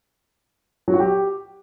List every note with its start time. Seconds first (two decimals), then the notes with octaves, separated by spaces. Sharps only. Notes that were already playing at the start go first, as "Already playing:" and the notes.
0.88 F#3
0.94 F#4
1.00 G4